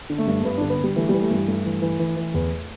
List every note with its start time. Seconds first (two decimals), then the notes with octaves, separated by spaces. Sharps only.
0.10 D3
0.18 A3
0.27 G2
0.41 A3
0.44 G2 B3
0.58 D3 D4
0.70 B3
0.79 D3 G3
0.96 E3 A3
1.09 E3 G3
1.21 A3
1.31 G2 G3
1.48 G2 A3
1.65 E3
1.82 E3
1.99 E3
2.16 E3
2.34 E2